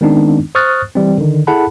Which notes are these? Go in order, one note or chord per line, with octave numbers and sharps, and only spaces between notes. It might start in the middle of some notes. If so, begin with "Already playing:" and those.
D#3 G#3 B3 C4 D4 D#4
C5 C#6 D#6 F6 F#6 A6
E3 G3 C4
D3 D#3
E4 G#4 A4 F#5 A5 B5